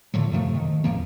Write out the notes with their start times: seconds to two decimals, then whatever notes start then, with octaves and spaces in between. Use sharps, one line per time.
0.14 A2 D3 F3 F#3
0.32 F#2 C3 F3 A3
0.55 D#3
0.84 A1 E2 F3 A#3